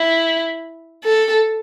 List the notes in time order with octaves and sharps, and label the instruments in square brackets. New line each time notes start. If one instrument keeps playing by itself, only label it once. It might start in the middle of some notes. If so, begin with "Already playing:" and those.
Already playing: [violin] E4
A4